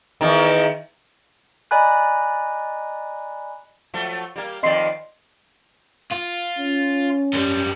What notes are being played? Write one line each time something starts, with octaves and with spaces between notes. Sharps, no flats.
E2 D#3
D5 D#5 G#5 A#5 B5 F#6
F3 F#3 A3
G3 A#3
F2 D#3 D5 D#5 C6 C7
F4
C#4
F#2 G3